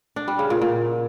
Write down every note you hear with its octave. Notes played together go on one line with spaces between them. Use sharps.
D4
G3
C#3
A#2
A#2